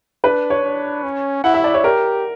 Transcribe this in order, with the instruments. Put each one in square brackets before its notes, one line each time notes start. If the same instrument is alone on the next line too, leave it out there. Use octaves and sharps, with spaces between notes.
[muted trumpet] D4 [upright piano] B4
[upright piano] C#5
[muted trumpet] D4
C#4
[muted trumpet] E4 [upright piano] F#5
[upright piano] E5
D5
C#5
[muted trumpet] G4 [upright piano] A#4